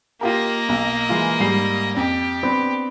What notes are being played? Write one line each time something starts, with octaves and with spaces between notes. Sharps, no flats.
A#3 F4 G4 A#4 D#5
B1
E3 G#3 F4
G#2 G3 C7
F2 G4
B3 C4 D4